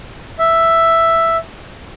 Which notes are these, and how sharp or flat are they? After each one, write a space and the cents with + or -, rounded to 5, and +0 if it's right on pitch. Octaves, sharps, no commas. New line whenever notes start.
E5 +5